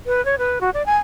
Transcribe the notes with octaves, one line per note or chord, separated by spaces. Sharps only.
B4
C#5
B4
F#4
D5
G#5